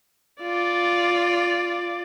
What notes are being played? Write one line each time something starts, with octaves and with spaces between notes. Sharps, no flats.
F4 D5